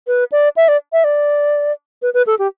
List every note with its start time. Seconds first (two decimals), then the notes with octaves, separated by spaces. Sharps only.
0.07 B4
0.32 D5
0.57 E5
0.68 D5
0.93 E5
1.04 D5
2.02 B4
2.14 B4
2.27 A4
2.39 G4